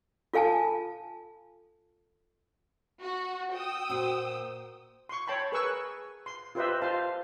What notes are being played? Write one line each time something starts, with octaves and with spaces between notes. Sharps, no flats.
F4 A4 F5 G#5 A5
F#4
G5 D#6 E6
A#2 F#4 C5
C6 C#6
C#5 G5 A5 B5 C6
G#4 A#4 B4 G#5 C#6 E6
C6
F4 G4 B4 C5 D#5 E5
F4 C5 F5 A5